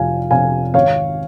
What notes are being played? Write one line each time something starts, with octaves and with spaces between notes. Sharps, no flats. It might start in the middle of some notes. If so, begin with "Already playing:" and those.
Already playing: F1 F2 C3 F3 F5 G#5
F2 C3 F3 F5 G#5
G#1 C#5 F5